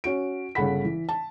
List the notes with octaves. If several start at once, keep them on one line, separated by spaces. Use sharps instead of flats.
C#4 F#4 D7
G1 C#3 A4 F#5 B5 B6
E3
A5